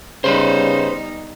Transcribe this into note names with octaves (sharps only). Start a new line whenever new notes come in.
C#3 G3 B3 D#4 B4 C5